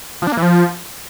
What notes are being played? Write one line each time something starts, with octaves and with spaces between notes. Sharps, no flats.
F3
D4
A#3
E3
F3